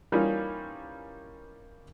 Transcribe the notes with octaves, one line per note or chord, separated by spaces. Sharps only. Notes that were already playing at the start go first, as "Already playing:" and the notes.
E3 G3 A#3 C#4 D#4 F4